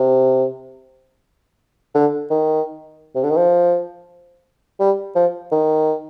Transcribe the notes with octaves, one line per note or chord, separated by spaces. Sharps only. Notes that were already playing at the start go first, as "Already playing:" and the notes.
Already playing: C3
D3
D#3
C3
D3
D#3
F3
G3
F3
D#3